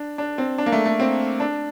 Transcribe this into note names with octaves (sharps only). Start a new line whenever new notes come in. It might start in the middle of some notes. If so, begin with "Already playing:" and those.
Already playing: D4
D4
C4
D4
A#3
A3
A3
C4
D4